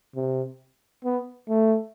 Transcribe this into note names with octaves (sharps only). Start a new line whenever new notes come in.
C3
B3
A3